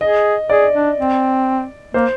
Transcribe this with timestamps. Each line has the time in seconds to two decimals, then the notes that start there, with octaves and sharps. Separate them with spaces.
0.01 G#4 D#5
0.50 G#4 D5
0.74 D4
0.98 C4
1.94 A#3 C5